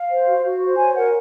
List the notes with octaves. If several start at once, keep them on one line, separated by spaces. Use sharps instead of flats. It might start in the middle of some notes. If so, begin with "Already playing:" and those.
Already playing: F5
C5
F#4
F#4
C5
C#5 G#5
A#4 F#5